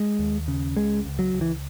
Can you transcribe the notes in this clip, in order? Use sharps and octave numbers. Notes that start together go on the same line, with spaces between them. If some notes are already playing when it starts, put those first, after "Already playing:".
Already playing: G#3
D#2
C#3
C#2 G#3
C#2
F#3
C#2
E3